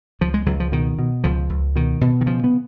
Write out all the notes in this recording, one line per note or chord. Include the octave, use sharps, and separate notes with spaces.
C#2 F3
G#3
C#2 F#3
F3
B2 D#3
B2
C#2 F3
C#2
B2 D#3
B2
D#3
C#3 F3
B3